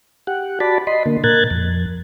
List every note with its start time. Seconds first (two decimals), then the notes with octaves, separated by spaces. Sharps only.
0.27 G4 F#5
0.60 F#4 D5 A5 B5
0.87 D#5 B5 C6
1.06 D3 A#3
1.24 A#2 A#4 F#6 G#6 A6
1.50 F2